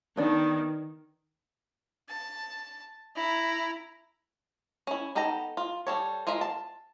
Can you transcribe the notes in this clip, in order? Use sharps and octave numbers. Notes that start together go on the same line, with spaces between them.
D#3 B3 D4
A5
E4 A#5
C#4 E4
B3 D#4 A4 G5 A#5
F4
G3 A4 C#5
G#3 F4 A#4 E5
A5